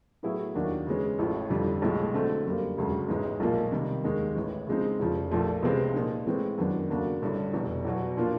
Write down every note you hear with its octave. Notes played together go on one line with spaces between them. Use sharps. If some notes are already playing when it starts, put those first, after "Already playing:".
A2 F#3 B3 E4 G#4
D#2 D#3 F#3 A#3 D4
C#3 E3 G#3 C#4
A1 A2 F3
G1 F2 D3 G3
B1 A2 F3 G#3
D3 F#3 A3 C4
F#2 D3 G3 A#3
E1 D2 C#3 F#3
A1 G#2 E3 G#3
B1 A#2 F3 A#3
C3 D#3 G3
D#2 D#3 G#3
A1 A2 E3
C#3 F3 G#3 C4 D#4
F1 E2 C#3 F3
A#1 A#2 F3 A3
C#2 C3 E3 G#3 C4
A#2 F3 A#3 D#4
A2 E3 G#3 C4
F#2 D#3 F#3 B3 D4
D2 C#3 F#3 A#3 D4
A1 G2 D3
F1 E2 B2
E2 B2 F#3 B3
A#2 F3 A#3 D4 F4